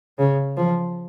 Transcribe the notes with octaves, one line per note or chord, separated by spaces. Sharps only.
C#3
F3